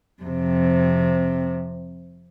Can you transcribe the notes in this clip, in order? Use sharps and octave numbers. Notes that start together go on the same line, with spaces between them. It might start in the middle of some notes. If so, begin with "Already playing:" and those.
F2 C3